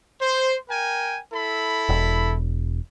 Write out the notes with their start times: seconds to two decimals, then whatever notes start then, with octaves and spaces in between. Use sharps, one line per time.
0.21 C5
0.70 A#4 G5 G#5
1.33 E4 A4 B5
1.89 E1